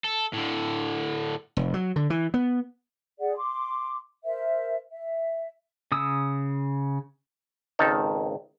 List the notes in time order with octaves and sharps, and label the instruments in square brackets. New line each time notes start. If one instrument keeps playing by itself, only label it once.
[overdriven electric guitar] A4
A2 D3
[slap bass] F1
F#3
D3
E3
B3
[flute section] G#4 D5 F#5
C6 D6
A#4 C5 E5
E5
[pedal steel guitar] C#3 D#6 E6
[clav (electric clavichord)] G#1 C#2 D#3 A4